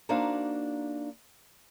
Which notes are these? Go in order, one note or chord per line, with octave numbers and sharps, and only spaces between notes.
A#3 D4 D#4 F#4 C5 F5